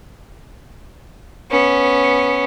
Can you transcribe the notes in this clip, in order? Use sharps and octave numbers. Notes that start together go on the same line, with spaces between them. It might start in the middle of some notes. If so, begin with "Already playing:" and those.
B3 C#4